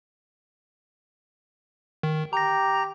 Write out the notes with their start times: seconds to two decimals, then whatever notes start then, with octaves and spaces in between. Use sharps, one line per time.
2.03 D#3
2.33 G4 A#5 A#6